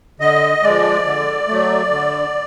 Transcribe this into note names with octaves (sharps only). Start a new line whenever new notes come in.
D3 D#5
F3 G#3 D5
D3
F#3 A3
D3